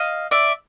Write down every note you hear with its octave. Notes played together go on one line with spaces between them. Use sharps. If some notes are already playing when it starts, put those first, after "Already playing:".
Already playing: D#5 F5
D5 E5